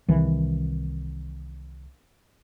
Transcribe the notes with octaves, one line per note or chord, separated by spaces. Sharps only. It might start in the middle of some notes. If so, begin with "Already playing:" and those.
C2 D#3 E3